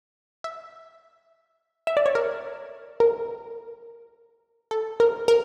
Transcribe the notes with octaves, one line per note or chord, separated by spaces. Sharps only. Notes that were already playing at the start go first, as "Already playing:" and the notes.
E5
E5
D5
C#5
A#4
A#4
A4
A#4
A#4